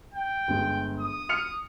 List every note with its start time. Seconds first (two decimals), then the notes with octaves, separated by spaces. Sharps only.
0.14 G5
0.48 G1 G#3
0.99 D#6
1.29 F6 C#7 F7